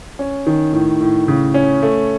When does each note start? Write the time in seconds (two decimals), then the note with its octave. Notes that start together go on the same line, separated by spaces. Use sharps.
0.19 C#4
0.46 D#3
0.73 A2
1.01 A2
1.28 C#3
1.54 C#4
1.83 A3